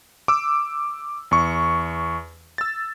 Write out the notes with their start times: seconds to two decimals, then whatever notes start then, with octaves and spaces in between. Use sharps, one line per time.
0.28 D6 E6
1.31 E2 C#6
2.58 E6 A6